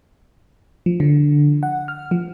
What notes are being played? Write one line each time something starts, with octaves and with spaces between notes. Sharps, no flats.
F3
D3
F#5
F6
F3